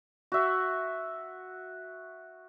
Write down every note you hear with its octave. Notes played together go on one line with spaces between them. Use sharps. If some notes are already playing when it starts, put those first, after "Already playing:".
F#4 E5